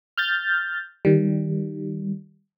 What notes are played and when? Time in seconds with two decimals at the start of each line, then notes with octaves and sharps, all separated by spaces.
0.18 F6 G6 A6
1.05 D#3 G3